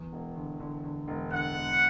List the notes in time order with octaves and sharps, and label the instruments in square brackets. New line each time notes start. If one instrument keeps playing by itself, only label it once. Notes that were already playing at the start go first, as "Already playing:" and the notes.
Already playing: [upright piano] E2
E1
D3
D3
D3
E1
[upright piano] D3 [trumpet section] F#5
[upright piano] E1